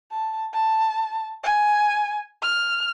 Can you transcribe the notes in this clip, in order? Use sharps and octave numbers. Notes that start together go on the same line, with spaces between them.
A5
A5
G#5
F6